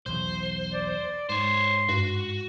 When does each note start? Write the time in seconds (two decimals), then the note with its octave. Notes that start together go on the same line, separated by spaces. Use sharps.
0.06 B1 E2 B2 C5
0.74 D5
1.29 G#2 C5 C#5 C6
1.89 G2 F#4